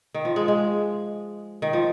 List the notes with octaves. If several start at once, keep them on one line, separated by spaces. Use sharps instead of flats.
D#3
F3
G#3
G#3
D#3
F3